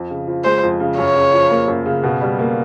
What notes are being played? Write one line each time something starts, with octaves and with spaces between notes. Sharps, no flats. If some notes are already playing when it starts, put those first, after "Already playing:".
Already playing: F2
C#3
F3
G#3 C5
F2
C#3
F#2 C#5
C#3
F3
A#3
F#2
C#3
B2
G3
A#3